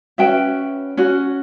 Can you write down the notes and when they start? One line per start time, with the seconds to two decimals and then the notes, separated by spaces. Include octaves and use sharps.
0.18 C#4 F#4 B4 E5 G5
0.97 C#4 F#4